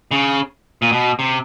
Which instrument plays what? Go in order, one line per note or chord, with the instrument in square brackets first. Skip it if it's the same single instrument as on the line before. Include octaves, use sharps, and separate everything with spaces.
[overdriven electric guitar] C#3
A#2
B2
C3